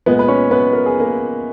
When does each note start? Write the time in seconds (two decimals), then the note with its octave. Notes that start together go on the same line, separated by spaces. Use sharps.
0.06 A#2 G#3 B3 B4
0.19 B4
0.28 C#4 C#5
0.51 B3 B4
0.73 A#4
0.86 G#4
1.00 A#3 A#4